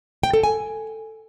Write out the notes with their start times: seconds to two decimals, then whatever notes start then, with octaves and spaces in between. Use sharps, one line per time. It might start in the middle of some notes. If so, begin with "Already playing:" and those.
0.23 G5
0.33 A4
0.44 G#5